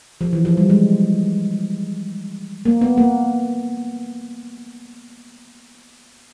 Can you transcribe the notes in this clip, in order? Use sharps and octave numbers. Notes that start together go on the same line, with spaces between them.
F3
E3
F3
G3
G#3
A#3
B3
A#3